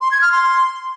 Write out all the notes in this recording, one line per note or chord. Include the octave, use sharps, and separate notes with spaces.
C6
G#6
F6
C6